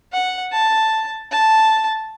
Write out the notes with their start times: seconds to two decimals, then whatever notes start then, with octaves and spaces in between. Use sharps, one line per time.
0.13 F#5
0.52 A5
1.31 A5